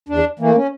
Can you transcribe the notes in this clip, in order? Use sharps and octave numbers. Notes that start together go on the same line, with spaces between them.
E2 D4
E3 A3 A#3
C#4